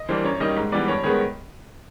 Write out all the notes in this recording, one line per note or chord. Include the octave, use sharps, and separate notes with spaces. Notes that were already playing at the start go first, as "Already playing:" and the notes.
Already playing: D#5
E3 G3 A#3 D4 C5
F#2 C#5
D#3 G3 A#3 D#4 D#5
G#2
E3 G3 B3 D5
G2 C#5
D#3 G#3 B3 C#5